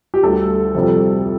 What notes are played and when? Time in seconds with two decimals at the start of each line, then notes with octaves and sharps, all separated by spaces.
0.14 G4
0.23 D2 D3 G3 A4
0.75 F2 C3 G3